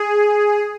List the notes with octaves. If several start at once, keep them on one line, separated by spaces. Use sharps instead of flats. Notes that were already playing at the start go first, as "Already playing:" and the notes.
Already playing: G#4